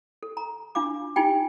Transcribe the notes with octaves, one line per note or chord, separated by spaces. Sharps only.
A4
A#5
D4 F4 F5 D6
D#4 F4 G4 G5 G#5